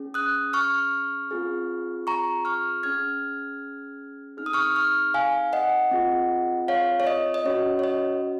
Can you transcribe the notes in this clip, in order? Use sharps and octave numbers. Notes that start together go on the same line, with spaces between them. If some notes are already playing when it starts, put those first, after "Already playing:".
Already playing: C#4 G#4
D#6 F#6
C#6 F6
C4 F4 G#4
A#5 C#6
C#6 F6
C#4 G#4 F6 G#6
C4 D#4 G#4 F6
D#6
C#6 F6
C#6 F6
F5 G#5
D#5 F#5
C4 F4 G#4
C#5 F5
C#5
D#5
D#5
C#4 F#4 C#5
C#5
D#5